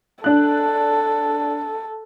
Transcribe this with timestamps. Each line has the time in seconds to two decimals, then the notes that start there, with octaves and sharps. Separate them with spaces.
0.24 D4 A4 F#6